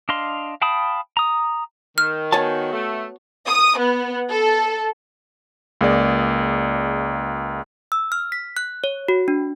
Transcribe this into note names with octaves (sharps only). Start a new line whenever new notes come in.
D4 D#5 F5 C6
F5 G5 A5 B5 D#6
A#5 D#6
D#3 F6
B3 F#4 C#5 G#5 A5
A3
D#6
B3
A4
C#2 A#3 G#4 D5
E6
F6
B6
F#6
C#5
F#4
D4